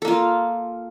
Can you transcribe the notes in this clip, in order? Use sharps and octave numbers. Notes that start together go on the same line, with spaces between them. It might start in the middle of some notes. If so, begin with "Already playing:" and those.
A#3 F4 A4